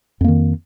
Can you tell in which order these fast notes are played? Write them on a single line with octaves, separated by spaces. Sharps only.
F2 A#3 D#3